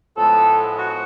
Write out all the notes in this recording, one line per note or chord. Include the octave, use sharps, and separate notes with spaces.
A2 F3 G#3 B3 A4
F#4